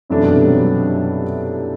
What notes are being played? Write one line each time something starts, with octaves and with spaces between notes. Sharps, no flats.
F#2 C3 E3 A3 C4 D4 A4
B2 B3
G2 G3
F#3
G2 G3